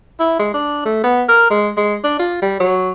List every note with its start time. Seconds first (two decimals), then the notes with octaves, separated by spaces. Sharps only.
0.19 E4
0.39 G#3
0.54 D4
0.85 A3
1.04 B3
1.29 A#4
1.50 G#3
1.77 G#3
2.04 D4
2.19 F4
2.42 G3
2.60 F#3